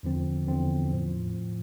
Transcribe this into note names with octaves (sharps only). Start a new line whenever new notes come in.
E2 D3 F3 C4
E2 D3 F3 C4
A2 F3